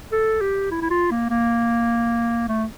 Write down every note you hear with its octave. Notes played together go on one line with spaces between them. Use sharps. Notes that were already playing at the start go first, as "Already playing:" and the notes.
A4
G4
E4
E4
F4
A#3
A#3
A3